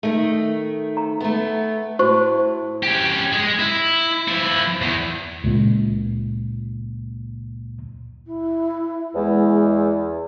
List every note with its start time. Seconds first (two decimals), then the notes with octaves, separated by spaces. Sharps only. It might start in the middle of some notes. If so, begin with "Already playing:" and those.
0.03 D#3 A3
0.97 A#5
1.21 A3 B3
1.99 A2 F#4 C5 C#6
2.83 C#4 G4
3.32 G#3 G#4
3.59 E4
4.28 F3 E4
4.82 E2
5.44 C#2 A#2
8.26 E4
9.15 E2 G#3